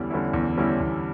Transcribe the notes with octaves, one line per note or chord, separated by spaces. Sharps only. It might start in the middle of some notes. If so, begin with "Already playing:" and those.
Already playing: E2 D3 G3 C#4 E4
D3 G3 C#4 E4
E2
D3 G3 C#4 E4
E2